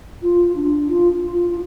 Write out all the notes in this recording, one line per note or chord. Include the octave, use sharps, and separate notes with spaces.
F4
D4
F4
F4
F4